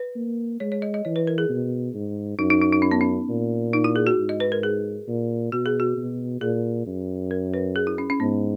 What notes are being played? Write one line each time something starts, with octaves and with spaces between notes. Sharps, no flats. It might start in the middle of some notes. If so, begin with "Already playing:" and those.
Already playing: B4
A#3
G#3 C#5
C#5
D#5
D#5
E3 C#5
B4
A#4
G#4
B2
G#2
F#2 D#4
D#4
D#4
D#4
C#4
B3
C#4
A#2
D#4
E4
G#4
F#4
G#2
D#5
B4
A#4
G#4
A#2
B2 F#4
G#4
F#4
B2
A#2 G#4
F#2
A#4
B4
G#4
E4
C#4
C#4
G#2 B3